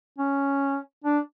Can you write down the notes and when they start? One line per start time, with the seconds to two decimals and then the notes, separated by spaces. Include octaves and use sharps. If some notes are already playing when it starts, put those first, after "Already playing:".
0.18 C#4
1.04 D4